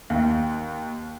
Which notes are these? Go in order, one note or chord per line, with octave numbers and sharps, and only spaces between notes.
D#2